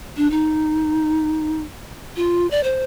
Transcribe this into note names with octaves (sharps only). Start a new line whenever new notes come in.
D4
D#4
F4
D5
C5